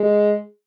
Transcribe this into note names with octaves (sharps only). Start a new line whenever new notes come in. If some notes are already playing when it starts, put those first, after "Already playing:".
Already playing: G#3